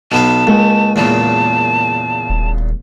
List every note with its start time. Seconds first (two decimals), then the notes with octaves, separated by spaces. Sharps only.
0.12 B1 B3 F5 A5
0.47 C#2 G#3 A#3
0.96 E2 A#2 C#3 A5
2.30 D#1